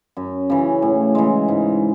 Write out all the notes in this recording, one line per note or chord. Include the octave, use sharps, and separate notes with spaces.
F#2
C#3 E3
A2
E3 G#3
G#2